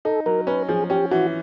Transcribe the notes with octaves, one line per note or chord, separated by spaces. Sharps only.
D#4 A4
F#3 A#4
C#4 B4
F3 G#4
C#4 G4
E3 F#4